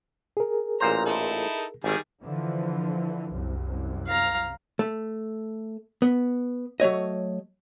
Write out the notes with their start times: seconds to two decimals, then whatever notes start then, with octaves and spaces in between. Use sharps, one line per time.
0.37 G#4 A#4
0.80 A1 A#2 C5 A#5
1.05 D#4 E4 A4
1.84 G#1 D#3 G3 G#4
2.23 D3 E3 F3
3.33 C2 F#2
4.07 F5 A#5
4.79 A3
6.02 B3
6.80 F#3 A3 C#5 D#5